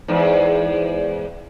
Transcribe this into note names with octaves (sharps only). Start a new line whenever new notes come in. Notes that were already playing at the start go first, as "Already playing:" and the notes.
E2 G#2